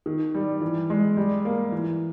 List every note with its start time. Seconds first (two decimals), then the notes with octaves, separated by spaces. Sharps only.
0.06 D#3
0.35 G3
0.61 E3
0.90 G#3
1.17 G3
1.45 A#3
1.72 E3